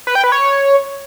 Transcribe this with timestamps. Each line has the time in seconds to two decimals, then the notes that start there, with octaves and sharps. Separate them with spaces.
0.07 B4
0.15 G5
0.24 B4
0.32 C#5